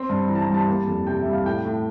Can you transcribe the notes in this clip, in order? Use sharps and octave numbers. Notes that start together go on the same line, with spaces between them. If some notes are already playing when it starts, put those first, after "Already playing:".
Already playing: C4 C6
G2
E3 A#5
A5
A#5
G3
A5
A#3
F2
C3 G5
E5
G3
F5
A2 G5
A2